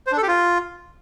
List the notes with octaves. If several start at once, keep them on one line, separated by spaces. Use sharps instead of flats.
C5
D4
A4
G4
F4